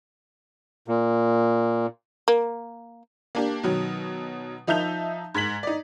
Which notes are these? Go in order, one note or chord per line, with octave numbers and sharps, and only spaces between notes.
A#2
A#3
A#3 D4 G4
B2 D#3 F#3
F3 D#4 E5 A5 G6 F7
G#2 G#6 B6 F#7
D#4 D5